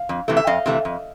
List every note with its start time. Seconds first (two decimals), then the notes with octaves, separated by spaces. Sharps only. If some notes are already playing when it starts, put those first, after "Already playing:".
Already playing: F5
0.09 F2
0.28 C3 E3 A3
0.37 E5
0.47 F2 D#5 F5
0.66 C3 E3 A3
0.85 F2